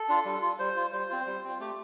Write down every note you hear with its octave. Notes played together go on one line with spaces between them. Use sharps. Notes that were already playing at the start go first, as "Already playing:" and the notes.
Already playing: A4
D4 F4
G3
F4
G3 C5
F4
G3 C5
C4 F4
G3
C4 F4
A3 G4